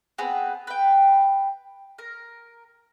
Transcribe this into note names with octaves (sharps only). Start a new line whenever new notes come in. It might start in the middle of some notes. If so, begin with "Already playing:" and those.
B3 C4 G#4 B4
B4 G5
A#4